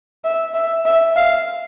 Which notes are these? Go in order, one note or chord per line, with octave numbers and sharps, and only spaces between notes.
E5
E5
E5
F5